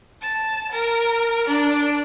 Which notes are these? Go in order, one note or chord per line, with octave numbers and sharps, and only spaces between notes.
A5
A#4
D4